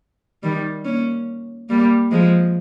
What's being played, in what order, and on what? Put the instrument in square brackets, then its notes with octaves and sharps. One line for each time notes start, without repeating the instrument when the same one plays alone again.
[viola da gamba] D#3 G3
A#3 C#4
G3 A#3
F3 G#3